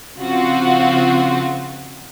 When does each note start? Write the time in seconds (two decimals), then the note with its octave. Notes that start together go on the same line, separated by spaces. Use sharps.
0.17 C#3 F3 C4 F4 F#4